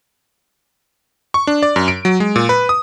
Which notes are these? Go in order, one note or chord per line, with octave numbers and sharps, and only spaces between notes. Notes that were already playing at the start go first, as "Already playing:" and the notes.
C#6
D4
D5
F#2
D7
F#3
G#3
A#2
B4
D#6